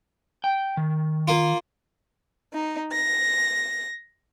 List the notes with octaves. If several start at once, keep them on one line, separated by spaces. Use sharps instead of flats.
G5
D#3
A#3 F4
D#4
A#6